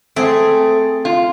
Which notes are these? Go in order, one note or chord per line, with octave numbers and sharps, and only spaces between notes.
A3 C4 G#4
F4